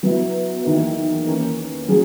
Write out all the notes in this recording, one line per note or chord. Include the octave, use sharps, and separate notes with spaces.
F#3 B3 E4
E2 D#3 A#3 E4
E3 A#3 C#4
F#3 C#4 G#4